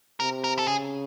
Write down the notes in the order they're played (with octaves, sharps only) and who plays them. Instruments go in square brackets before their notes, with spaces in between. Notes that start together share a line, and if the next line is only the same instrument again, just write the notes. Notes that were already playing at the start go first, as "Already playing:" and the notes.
[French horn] C3 [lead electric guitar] A#4
[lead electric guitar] A#4
A4
[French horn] C#3 [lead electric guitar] G#4